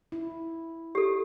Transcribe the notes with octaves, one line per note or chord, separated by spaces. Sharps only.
E4
G4 A4